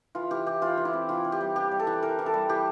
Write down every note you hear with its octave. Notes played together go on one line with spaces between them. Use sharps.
E3 F4
E3 G4
E3 G4
E3 F4
E3
E4
C4
E3 F4
E3
G4
G3
E3 G4
G3
A4
E3
E3 A#4
E3
A4
G3
E3 G4